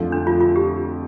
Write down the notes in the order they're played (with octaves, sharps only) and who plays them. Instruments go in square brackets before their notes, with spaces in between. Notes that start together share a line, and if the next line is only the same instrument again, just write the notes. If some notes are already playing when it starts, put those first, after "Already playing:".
Already playing: [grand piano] F2 D3 A3 F4
[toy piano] D4
F4
F4
G4